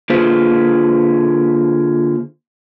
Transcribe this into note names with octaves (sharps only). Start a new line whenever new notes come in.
D3 A#3 F4 G#4 B4 C5